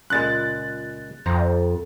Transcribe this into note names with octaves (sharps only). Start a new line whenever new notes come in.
C#2 A#2 G#3 F#6 A6
F2 C5 A#5